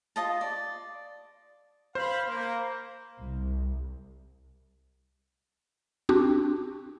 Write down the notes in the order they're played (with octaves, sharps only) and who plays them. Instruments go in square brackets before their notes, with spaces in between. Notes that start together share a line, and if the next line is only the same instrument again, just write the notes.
[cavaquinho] F4 D#5 A5
D5
[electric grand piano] C5 [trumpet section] F5 B5
[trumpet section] A#3
[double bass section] C2
[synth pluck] C4 D4 F#4 G4